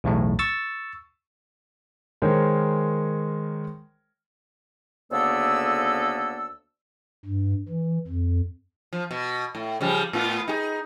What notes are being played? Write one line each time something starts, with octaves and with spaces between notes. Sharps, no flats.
B1 E2 A2
C#6 E6 A6
D#3 G#3 A#4 C5 C#5
D2 C#3 A#3 B3 A4 E6
G2
E3
F2
F3
B2
A2
C#3 F3 G3
A2 B3 F4
D#4 G4 G#4